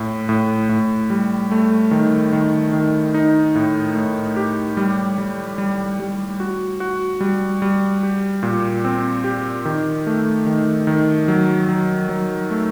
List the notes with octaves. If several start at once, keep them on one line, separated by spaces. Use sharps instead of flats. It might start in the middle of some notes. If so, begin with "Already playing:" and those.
Already playing: A2
A2
A2
G3
A3
D#3
D#3
D#3
D#4
A2
A2
G4
G3
G3
G3
G3
F#4
F#4
G3
G3
G4
A#2
C4
G4
D#3
A3
D#3
D#3
F#3
F#3
F#3
A3